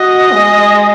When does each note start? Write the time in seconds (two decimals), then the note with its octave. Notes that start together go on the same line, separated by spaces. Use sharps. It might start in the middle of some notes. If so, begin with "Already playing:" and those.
Already playing: F#4 D#5
0.33 G#3